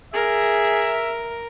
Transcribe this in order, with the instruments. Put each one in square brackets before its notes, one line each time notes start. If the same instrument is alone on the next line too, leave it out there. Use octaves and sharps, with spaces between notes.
[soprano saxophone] G#4 [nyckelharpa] A#4 [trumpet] E5